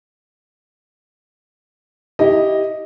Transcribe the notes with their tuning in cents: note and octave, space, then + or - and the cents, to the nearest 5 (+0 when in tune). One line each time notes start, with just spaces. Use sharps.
E4 -15 G4 +0 D#5 +0